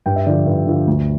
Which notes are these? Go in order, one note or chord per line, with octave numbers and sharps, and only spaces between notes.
G2 G5
E5
D3 F3 D5
G2
D3 F3
D2